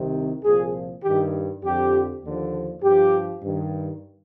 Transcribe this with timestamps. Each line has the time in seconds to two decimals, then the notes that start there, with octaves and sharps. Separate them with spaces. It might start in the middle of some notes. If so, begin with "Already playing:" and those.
Already playing: C2 C3 D#3
0.43 C2 A#2 F3 G#4
1.02 G2 D#3 G4
1.62 F2 D3 F3 G4
2.22 D#2 D3 F3
2.82 G2 F3 G4
3.41 G2 D#3